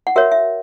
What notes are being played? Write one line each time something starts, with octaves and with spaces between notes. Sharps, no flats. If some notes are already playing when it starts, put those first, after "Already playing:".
F#5
F#4 A#4 C#5 E5
E5